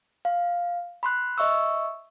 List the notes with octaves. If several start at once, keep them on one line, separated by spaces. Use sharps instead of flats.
F5
B5 C6 F#6
D#5 E5 C#6 E6